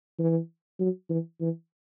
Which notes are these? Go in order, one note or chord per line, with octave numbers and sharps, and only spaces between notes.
E3
F#3
E3
E3